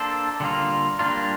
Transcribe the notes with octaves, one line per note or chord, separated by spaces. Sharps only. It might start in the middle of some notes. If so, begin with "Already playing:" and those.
Already playing: A#3 D4 A4 C5
D3 G3 A#3 F4
G3 A#3 D4 F4